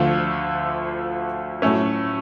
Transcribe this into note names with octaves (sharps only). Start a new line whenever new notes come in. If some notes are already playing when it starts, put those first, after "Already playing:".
Already playing: D2 D3 F3 A3 F4
A2 F#3 A3 C#4